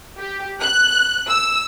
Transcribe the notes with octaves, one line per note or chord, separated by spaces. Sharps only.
G4
F#6
E6